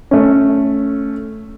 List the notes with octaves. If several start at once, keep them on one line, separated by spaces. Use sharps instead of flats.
A3 C#4